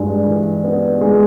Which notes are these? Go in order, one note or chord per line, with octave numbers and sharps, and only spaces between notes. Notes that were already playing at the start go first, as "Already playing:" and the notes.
Already playing: G2 G#3
E3
B3
G#3